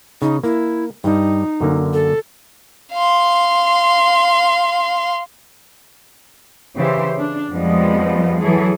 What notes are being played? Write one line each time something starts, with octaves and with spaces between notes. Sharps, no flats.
C#3 D#4
A#3 E4
G2 G3 D#4
F#2 D3 A#3
A4
F5 C6
C#3 E3 G4 C5 E5
D4
F2 F3 G3 G#3 B3 D#5
E3 F#3 G#4 A4